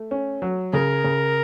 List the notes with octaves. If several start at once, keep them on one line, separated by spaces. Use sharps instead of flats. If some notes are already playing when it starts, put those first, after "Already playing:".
Already playing: A3
C#4
F#3
C#3 A#4
C#3